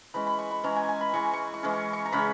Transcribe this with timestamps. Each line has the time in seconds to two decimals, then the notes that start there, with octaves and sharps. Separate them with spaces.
0.14 E3 G#3 C#4 B5
0.27 B5
0.39 C#6
0.51 B5
0.63 E3 G#3 C#4 A#5
0.76 G#5
0.89 G#5
1.01 B5
1.13 E3 G#3 C#4 C#6
1.33 C#6
1.54 C#6
1.63 E3 G#3 C#4
1.73 C#6
1.93 C#6
2.06 A#5
2.12 C#3 G#3 C#4 B5